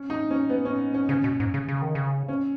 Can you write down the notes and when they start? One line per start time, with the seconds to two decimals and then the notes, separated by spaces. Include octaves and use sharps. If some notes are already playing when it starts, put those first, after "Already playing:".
Already playing: C#4
0.10 D#4
0.31 C#4
0.50 B3
0.65 C#4
0.94 C#4
1.09 C#3 C#4
1.24 B2
1.40 G#2
1.54 C#3
1.68 C#3
1.82 D#3
1.95 C#3
2.28 C#4